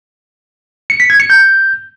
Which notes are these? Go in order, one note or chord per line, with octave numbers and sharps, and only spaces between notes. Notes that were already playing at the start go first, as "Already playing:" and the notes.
C#7
B6
G#6
C#7
G6